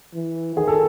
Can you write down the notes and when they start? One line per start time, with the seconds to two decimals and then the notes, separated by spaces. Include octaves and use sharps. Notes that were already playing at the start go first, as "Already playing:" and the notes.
0.15 E3
0.56 D#3 G#4
0.68 A4